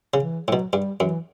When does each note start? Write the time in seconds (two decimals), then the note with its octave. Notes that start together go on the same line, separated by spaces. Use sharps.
0.14 C#3
0.20 E3
0.47 A2 F#3
0.53 B2
0.73 G2 G3
0.99 F#2 E3